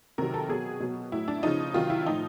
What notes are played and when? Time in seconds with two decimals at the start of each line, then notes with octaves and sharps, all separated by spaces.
0.18 C3 D#3 F#3 A#4
0.34 A4
0.48 B2 F#3 G#4
0.80 B2 F#3
1.12 A2 F#3 E4
1.28 D4
1.43 C#3 F3 D#4
1.74 C3 D#3 F#3 F4
1.90 E4
2.06 A2 F3 D#4